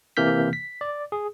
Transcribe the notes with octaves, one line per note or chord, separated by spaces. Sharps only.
C3 E3 A#3 F6 G6 B6
B6
D5
G#4